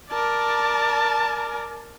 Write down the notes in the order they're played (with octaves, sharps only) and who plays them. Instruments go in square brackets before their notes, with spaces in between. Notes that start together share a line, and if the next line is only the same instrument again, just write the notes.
[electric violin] A#4 D5 [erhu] A5